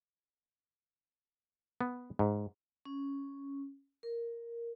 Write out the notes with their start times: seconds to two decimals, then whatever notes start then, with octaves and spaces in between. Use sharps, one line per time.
1.81 B3
2.19 G#2
2.85 C#4
4.03 A#4